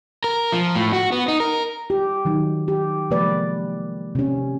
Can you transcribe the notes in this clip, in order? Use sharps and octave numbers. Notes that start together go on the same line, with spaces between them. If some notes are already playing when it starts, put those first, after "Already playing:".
A#4
F3
A2
F#4
B3
D#4
A#4
G4
D#3 F#3 D#4
G4
C3 F3 G#3 A#3 B4 D5
C3 C#4